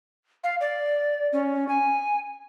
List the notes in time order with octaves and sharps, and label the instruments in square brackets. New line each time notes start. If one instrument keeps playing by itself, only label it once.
[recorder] F5
D5
C#4
G#5